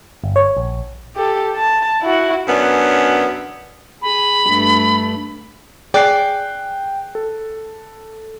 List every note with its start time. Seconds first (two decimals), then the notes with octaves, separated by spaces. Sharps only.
0.24 G1
0.36 C#5
0.57 A#1
1.16 G4 A4
1.56 A5
2.03 E4 F#4
2.47 F#2 B3 C#4 D4
4.02 G#4 B5
4.46 G2 A3
5.94 G#4 D5 G5 F#6 C7
7.15 A4